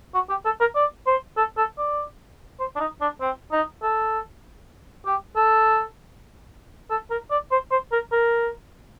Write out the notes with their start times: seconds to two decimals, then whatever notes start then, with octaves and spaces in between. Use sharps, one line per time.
0.14 F#4
0.30 G4
0.45 A4
0.60 A#4
0.75 D5
1.07 C5
1.37 A4
1.57 A4
1.78 D5
2.60 C5
2.76 D4
2.80 D#4
3.01 D4
3.21 C4
3.52 D#4
3.83 A4
5.06 G4
5.36 A4
6.90 A4
7.11 A#4
7.31 D5
7.51 C5
7.71 C5
7.92 A#4
8.12 A#4